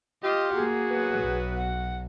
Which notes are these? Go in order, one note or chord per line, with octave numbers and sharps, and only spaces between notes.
F4 G4 D#5
A#3 F#4 G#4
F#3 B3 B4
B1
F#5